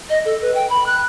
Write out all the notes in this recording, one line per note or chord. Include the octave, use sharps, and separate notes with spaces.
D#5
A4
B4
G5
B5
F#6